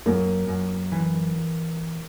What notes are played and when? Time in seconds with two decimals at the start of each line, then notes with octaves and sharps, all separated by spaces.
0.06 F#2 A#3
0.48 F#2
0.92 E3